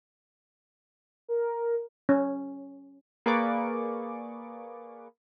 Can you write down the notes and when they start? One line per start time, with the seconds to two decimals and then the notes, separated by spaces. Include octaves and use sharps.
1.28 A#4
2.09 C#4
3.26 A#3 G#4 B4 D5 C#6 D6